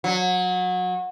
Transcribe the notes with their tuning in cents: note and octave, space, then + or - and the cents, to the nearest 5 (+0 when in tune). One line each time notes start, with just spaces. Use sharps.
F#3 -25